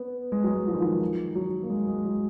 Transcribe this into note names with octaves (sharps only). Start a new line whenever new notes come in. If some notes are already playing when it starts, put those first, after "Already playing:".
Already playing: B3
G#3
F#3
G#3
F3
D#3
F3
D#3
F#3
A#3
G#3
G#3
F#3